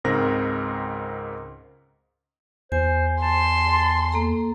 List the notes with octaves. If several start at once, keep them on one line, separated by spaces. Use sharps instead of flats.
C#2 G#2 C4 A#4 A#6
E2 C5 G#5
A5 C6
A#3 A4 A#5